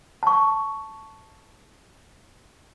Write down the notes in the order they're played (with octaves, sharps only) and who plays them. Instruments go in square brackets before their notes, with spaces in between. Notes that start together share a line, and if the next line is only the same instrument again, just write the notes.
[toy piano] A5 C#6